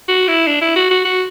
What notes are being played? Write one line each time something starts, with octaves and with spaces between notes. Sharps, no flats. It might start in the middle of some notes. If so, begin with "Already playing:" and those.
F#4
E4
D4
E4
F#4
F#4
F#4